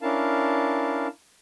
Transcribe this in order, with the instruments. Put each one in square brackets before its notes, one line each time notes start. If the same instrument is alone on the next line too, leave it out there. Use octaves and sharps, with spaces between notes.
[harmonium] C#4 D4 E4 A#4 F5 A5